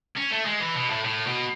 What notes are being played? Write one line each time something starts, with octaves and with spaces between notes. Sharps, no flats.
C#4
A3
G#3
E3
B2
A2
A2
B2